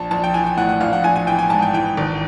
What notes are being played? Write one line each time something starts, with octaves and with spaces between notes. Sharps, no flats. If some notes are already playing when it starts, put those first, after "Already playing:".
Already playing: A#1 A5
A#1 A5
G5
E3 G#5
G5
A2 F#5
F#5
A#1 F5
F#5
A#1 G#5
G#5
E3 G5
G#5
G#2 A5
G5
E3 G5
G#1